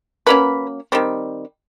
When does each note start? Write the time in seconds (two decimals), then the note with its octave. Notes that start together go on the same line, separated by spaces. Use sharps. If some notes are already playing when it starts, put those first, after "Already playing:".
0.27 F#3 A#3 C#4 B4 B5
0.92 D#3 G3 C4